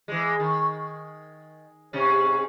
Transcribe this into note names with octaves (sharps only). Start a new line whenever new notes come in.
E3 G#3
D#3
G#2 C3 C#4